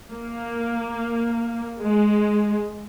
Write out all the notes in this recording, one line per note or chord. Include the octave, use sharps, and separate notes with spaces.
A#3
G#3